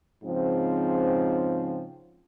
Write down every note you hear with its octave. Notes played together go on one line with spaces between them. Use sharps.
G#2 C#3 F3 C4